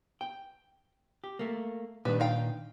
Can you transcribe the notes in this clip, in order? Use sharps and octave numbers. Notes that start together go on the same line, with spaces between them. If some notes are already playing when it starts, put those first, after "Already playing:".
G5
G4
A3 A#3
A#2 D#3 G3 D4 B4
D#4 F5 G5